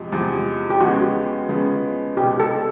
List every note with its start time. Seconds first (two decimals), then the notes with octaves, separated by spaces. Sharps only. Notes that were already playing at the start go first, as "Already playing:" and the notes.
Already playing: E2 C3 F3 G#3
0.12 E2 C3 F3 G#3
0.70 G4
0.81 C#3 F3 G#3 B3 F#4
1.49 C#3 F3 G#3 B3
2.17 C2 B2 G#3 G4
2.40 A4